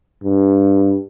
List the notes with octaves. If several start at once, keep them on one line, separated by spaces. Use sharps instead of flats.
G2